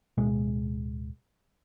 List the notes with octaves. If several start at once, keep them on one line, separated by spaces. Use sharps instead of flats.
D1 B2 G#3